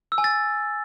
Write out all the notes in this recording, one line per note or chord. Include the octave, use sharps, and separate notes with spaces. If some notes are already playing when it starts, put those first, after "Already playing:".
E6
G#5
A6